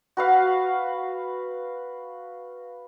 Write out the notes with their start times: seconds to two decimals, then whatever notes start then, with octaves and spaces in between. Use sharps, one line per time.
0.17 F#4 B4 F5